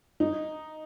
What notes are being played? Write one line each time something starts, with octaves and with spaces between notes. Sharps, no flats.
D#4